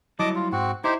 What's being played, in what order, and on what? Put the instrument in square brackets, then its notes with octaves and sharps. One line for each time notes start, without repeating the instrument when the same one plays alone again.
[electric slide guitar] F#3 G3 E4 [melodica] D#5 A5 D6
[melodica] F4
[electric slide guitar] G#2 [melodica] C4 F#4
[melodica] D#4 G4 C5 [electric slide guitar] E4